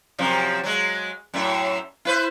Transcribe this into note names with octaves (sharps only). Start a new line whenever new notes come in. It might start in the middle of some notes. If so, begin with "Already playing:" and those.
F#2 C3 F3
F#3 G#3
F#2 A2 E5
E4 B4 C5